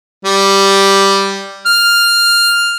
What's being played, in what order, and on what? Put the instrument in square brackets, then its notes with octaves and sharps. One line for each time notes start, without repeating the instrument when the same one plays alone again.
[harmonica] G3
F6